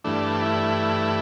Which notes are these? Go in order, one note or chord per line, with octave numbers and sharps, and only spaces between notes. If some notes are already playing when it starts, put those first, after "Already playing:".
G2 E3 A3 D4
E4